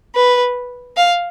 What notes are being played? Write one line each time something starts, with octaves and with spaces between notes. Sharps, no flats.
B4
F5